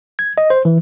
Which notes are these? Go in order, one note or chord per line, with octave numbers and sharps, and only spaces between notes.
G#6
D#5
C5
E3